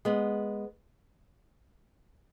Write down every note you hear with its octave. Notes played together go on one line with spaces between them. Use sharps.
G#3 B3